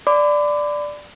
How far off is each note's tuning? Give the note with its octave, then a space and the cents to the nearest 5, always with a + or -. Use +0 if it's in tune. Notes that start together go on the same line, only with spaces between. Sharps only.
D5 +5 B5 +35 D6 +0